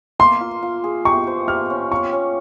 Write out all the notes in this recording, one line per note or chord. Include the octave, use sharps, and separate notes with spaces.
A#3 C6
F4
F4
G#4
G4 C#6
C5
G4 F6
C#4
F4 C#6
C#4